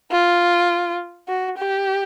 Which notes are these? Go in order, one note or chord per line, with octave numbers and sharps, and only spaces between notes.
F4
F#4
G4